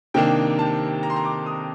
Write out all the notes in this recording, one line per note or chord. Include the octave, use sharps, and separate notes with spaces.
C3 D#3 A#3 D4 G5
A5
A#5
C6
A#5
D6
D#6